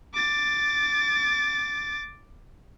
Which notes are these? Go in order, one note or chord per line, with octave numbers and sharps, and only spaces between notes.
D6 A6